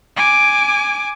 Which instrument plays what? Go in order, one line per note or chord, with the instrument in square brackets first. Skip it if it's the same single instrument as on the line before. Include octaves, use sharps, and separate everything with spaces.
[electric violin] G#5 D6